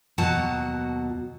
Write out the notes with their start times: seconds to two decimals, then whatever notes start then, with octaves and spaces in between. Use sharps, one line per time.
0.18 D#2 B2 F#3 F#4 F#5 A5